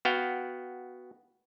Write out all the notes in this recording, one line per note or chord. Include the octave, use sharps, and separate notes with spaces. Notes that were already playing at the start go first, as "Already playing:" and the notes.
B3 F#4 F5 G5